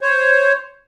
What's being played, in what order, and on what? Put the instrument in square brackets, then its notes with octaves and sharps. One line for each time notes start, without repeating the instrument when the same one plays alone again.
[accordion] C5 C#5